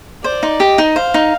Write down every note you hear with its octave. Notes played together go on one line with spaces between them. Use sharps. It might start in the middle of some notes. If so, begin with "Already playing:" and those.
C5 D5
D#4
G4 D#5
D#4
C5 F5
D#4